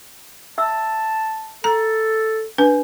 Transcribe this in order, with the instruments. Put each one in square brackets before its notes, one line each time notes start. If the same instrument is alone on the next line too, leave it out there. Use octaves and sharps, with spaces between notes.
[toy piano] E5 E6 [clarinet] A5
[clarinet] A4 [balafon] A#5
[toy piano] D4 [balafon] B4